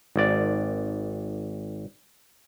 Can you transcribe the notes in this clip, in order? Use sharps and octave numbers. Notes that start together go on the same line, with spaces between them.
G#1 D5